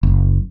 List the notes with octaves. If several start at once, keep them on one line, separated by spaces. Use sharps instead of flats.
F#1